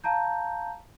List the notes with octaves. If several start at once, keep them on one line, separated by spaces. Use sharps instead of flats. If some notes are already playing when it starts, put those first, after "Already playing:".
F5 A5 A#5 G6